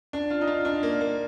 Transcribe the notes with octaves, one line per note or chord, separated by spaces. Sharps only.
D4
F4
D#4
F4
D4
A#3
A#3